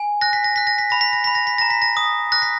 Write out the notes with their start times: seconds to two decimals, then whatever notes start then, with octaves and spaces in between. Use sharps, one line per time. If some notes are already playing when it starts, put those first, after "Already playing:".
Already playing: G#5
0.21 F#6 A#6
0.33 B6
0.44 A#6
0.56 F#6 B6
0.67 A#6
0.78 B6
0.90 B5 A#6
1.01 B6
1.13 A#6
1.24 B5 B6
1.35 A#6
1.47 B6
1.58 A#5 A#6
1.70 B6
1.82 A#6
1.97 D#6
2.32 F#6 A#6
2.42 B6